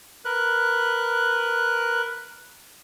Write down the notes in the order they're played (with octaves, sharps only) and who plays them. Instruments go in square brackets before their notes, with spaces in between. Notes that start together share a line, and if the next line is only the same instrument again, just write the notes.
[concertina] A#4 B4 F#6